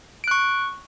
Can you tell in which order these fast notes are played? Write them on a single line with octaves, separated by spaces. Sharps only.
D7 F#6 C#6